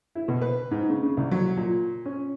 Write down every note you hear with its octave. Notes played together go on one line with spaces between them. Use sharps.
E4
B2
B4
G#2
C#3
C#3
C2
F#3
A#2
C#4